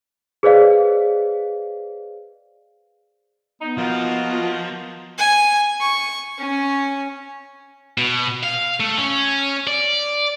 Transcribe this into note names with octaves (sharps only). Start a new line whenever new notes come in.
G#4 B4 C5 D5 D#5 F5
B3 D#4
F3 A#3 F4 F#4 A#4 D#5
G#5
C#6
C#4
B2
F5
A3
C#4
D5